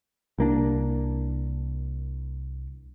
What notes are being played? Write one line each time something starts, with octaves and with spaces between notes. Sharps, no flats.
C2 A#3 D4